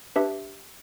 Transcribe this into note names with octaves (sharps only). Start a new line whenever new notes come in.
D4 G4 B4 E5